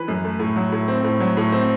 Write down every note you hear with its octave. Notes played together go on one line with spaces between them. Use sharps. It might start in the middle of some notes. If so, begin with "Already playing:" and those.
Already playing: E3 B4
F#2
A3
A2
F#3
A2
C4
A2
F#3
A2
C4